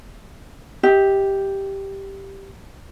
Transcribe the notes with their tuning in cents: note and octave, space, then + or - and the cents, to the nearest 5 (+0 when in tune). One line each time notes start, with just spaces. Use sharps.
G4 +0 D#5 +35